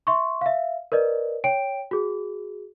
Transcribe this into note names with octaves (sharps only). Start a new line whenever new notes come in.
E5 C6 C#6
E5 F5
A#4 B4 D5 D#5
C#5 G5 D7
F#4 G#4